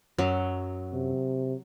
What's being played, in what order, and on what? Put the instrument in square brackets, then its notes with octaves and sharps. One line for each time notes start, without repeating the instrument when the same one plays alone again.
[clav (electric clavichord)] F#2 [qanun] F#3
[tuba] C3